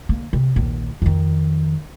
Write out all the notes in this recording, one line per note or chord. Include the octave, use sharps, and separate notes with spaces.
D3 A#3
C3
A#1 D#2
F2 D#3